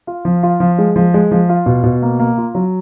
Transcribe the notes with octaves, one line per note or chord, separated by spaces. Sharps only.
F4
F3
F4
F3
G#3
F3
G#3
F3
F4
B2
B2
A#3
A#3
F4
F#3